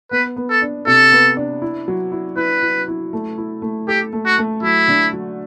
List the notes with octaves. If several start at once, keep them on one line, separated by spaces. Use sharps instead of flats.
B3 B4
B3
A4
D4
C3 A4
B3
D4
E4
F#3
E4
E4 B4
E4
E4
A3
E4
A3
G4 A4
A3
F#4
A3
F#3 E4
D3
F#3